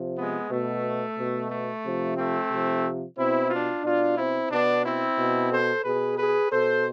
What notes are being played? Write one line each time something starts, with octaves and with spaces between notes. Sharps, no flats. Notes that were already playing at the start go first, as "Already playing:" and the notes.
Already playing: C3 F3
G#3 B3
B2 A3
B2
A3
C3 F3
A3 C4
C3 F3
B2 C4 E4
D4 F4
B2 D4 F4
C4 E4
B2 B3 D4
C4 E4
B2
A4 C5
B2 G#4 B4
G#4 B4
B2 A4 C5